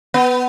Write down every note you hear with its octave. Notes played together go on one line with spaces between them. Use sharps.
B3